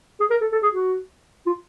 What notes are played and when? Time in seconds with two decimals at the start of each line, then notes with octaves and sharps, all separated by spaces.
0.20 G#4
0.30 A#4
0.41 A4
0.52 A4
0.62 G#4
0.73 F#4
1.46 F4